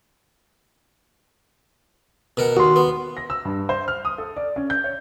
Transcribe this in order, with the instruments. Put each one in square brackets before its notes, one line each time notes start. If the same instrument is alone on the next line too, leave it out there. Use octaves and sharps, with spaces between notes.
[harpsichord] B2 A#4 F#5
[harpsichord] D#2 [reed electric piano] F#4 C6
[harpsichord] B3
[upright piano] A#6
E6
G2
C5
F6
D#6
A4
D5
C#4
G6
C#5